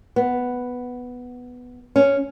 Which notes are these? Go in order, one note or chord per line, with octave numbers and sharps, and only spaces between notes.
B3
C#4